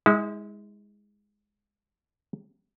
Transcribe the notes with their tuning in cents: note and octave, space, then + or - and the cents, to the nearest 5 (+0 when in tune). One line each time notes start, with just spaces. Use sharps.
G#3 -10 E4 -45